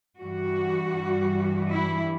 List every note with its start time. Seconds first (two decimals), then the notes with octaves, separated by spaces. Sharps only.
0.21 G2 E3 G3 F#4
1.70 E4